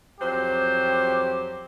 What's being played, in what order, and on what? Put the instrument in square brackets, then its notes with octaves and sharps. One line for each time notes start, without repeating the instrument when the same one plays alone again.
[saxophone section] F2 F#3 C5 [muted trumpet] G4